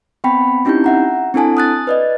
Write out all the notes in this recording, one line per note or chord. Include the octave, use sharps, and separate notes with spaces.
B3 C4 G5 B5 B6
C4 C#4 D#4 E4 G4 G6
E5 F#5 A#5
C4 D4 E4 A4 G#5 A5
D#6 F#6 A6
B4 D5 D#5